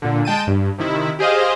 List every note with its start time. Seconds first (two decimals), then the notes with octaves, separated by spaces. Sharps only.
0.02 A#2 D3
0.25 G#3 G5 A5 D#7
0.47 G2
0.78 C3 D#3 E4
1.19 G4 G#4 C5 D#5 F5